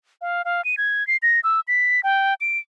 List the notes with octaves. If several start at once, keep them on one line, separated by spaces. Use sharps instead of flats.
F5
F5
D#7
G#6
C7
A#6
E6
B6
G5
D7